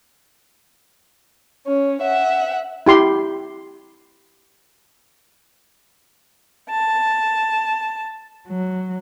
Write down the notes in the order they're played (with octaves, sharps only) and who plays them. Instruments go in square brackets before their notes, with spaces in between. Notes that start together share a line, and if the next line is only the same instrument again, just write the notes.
[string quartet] C#4
E5 F#5
[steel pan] E4 G4 C6
[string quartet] A5
F#3